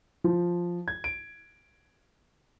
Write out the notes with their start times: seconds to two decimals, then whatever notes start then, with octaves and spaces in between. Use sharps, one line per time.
0.24 F3
0.88 G#6
1.04 D7